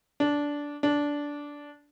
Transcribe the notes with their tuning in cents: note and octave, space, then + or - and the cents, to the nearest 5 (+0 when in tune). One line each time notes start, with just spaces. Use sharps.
D4 -15
D4 -15